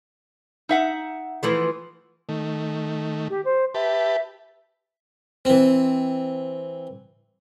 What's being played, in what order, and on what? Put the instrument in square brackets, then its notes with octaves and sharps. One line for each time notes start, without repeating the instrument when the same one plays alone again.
[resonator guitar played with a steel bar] D#4 E5 F#5
[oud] E3 F3 A3
[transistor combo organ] D#3 A3
[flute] G4
C5
[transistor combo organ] G4 B4 A5 [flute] E5
[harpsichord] E3 C4